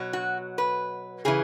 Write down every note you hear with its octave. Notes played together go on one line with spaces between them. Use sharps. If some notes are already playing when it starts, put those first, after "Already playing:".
Already playing: B2 F#3
F#4
B4
C#3 E3 G#4